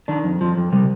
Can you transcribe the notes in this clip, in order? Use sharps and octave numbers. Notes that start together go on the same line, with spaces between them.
D#3 D4
F2
F2 F3
F2
C3 G3